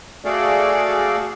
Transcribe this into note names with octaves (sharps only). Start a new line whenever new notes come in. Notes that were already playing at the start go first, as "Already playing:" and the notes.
A3 F#4 G#4 A4 D5 F5